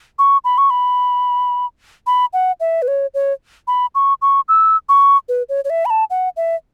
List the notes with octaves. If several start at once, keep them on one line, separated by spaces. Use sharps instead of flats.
C#6
B5
C#6
B5
B5
F#5
E5
B4
C#5
C#5
B5
C#6
C#6
E6
C#6
B4
C#5
C#5
E5
B5
A5
F#5
E5